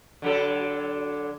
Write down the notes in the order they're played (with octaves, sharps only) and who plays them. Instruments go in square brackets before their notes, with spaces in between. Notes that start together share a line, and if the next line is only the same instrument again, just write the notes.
[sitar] D3 F#3 A4